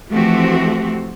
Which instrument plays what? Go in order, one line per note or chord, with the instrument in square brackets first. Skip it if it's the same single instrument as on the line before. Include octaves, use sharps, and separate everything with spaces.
[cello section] E3 F3 A3 C4 F#4 G4